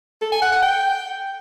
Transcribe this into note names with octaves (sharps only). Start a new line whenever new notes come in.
A4
G#5
F#5
F#5
G5